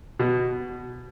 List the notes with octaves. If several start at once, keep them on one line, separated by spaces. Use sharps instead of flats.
B2